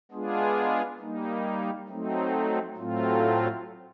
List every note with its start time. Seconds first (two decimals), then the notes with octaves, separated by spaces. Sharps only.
0.12 G#3 B3 D4 F4 G#4
0.99 G3 A#3 D#4
1.88 F#3 A3 C4 D#4
2.77 A2 F#3 A3 C4 F4